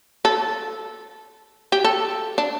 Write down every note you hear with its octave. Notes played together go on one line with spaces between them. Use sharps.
A4
G4
A4
D4